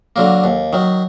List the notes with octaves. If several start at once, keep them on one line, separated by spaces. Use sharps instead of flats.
D3 F#3 A#3
D#2
D#3 F#3